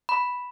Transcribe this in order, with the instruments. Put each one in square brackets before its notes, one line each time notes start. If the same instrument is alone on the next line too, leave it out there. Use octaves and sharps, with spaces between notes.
[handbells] B5